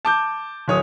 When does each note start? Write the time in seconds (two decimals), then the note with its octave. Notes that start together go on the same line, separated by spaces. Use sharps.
0.05 A5 D6 G6
0.68 D1 C#5 D#6